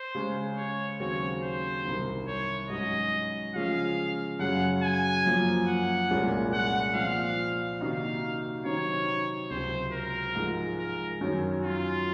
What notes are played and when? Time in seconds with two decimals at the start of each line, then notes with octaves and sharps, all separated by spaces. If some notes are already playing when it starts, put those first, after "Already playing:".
Already playing: C5
0.15 C#3 G#3 C#4
0.57 C#5
1.00 D#2 C#3 F#3 C4 F#4 C#5
1.43 C5
1.85 C2 C3 D#3
2.27 C#5
2.70 G#2 F#3 C#4 F#4 D#5
3.54 C#3 F3 G#3 C#4 F4 F5
4.39 F#2 C#3 F#3 C#4 F#5
4.83 G#5
5.25 F#2 F3 A#3 C#4
5.68 F#5
6.10 C2 A#2 G#3 C#4 F4
6.53 F#5
6.95 A#2 F3 C4 F5
7.80 C3 D#3 A#3 D#4 F#4 F5
8.65 C3 D#3 F#3 C4 D#4 C#5
9.50 C#2 C3 F#3 C4 C5
9.93 A#4
10.35 G#2 F3 G#3
10.78 A#4
11.21 F#2 D#3 F#3 C#4
11.63 F4